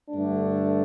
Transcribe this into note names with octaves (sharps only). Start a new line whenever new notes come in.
G2 D3 A3 D4